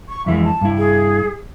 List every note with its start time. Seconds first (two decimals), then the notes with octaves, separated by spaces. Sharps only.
0.08 C#6
0.26 F2 E3 G#3 E5
0.44 A5
0.61 G2 E4
0.78 G#4